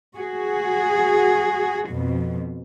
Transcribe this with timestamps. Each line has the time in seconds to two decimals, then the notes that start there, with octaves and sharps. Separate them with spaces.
0.16 F#4 G#4
1.90 F2 B2